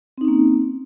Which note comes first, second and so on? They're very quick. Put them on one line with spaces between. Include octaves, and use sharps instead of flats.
C4 D#4 C#4 A#3